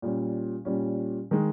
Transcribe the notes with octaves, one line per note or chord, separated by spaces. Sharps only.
A#2 G3 C#4
A#2 G3 C#4
D#3 G#3